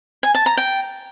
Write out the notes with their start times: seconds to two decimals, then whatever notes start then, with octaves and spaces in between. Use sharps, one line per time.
0.23 G#5
0.35 A5
0.46 A#5
0.57 G5